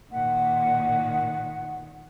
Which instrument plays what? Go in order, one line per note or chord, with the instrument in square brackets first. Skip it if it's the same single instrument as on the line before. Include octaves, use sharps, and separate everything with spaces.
[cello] A#2 D#3 [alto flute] F#5